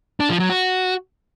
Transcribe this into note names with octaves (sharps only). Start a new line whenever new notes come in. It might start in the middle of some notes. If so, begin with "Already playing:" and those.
D4
F3
F#3
F#4